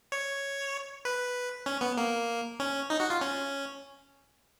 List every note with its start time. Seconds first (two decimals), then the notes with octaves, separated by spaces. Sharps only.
0.12 C#5
1.05 B4
1.66 C#4
1.81 B3
1.97 A#3
2.60 C#4
2.90 D#4
3.00 F#4
3.10 F4
3.21 C#4